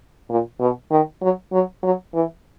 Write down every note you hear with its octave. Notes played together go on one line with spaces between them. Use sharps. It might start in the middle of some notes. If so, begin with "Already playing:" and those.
A#2
B2
D#3
F#3
F#3
F#3
E3